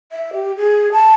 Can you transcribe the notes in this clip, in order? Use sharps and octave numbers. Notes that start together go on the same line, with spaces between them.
E5
G4
G#4
A5